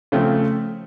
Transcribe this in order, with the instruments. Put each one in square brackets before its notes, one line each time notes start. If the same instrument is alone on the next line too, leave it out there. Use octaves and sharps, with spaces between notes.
[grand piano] C#3 F3 A3 C4